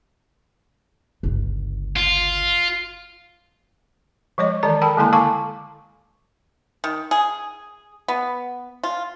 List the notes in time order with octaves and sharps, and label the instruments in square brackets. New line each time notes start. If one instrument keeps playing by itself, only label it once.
[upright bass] G1 C#2
[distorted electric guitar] F4
[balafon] F3 G#3 C#5 D#5
D#3 E3 G#3 D5 A#5
A4 A#4 G5 A5 B5
D3 G#3 A#3 E4 A5 C6
A4 F5 G#5 A5 C#6 D6
[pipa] D#3
G#4
B3
F4